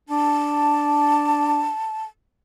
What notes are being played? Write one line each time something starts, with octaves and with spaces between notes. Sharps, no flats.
D4 A5